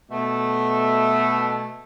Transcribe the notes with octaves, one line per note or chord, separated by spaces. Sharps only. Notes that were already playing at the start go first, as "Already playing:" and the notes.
B2 A3